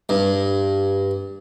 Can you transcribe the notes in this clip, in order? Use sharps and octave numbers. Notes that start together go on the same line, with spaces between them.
G2